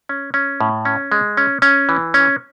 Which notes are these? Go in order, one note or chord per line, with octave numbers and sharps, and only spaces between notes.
C#4
C#4
A2
C#4
G#3
C#4
C#4
E3
C#4